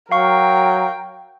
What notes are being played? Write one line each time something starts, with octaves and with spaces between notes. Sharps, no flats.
F#3 A#4 F5 G5 C#6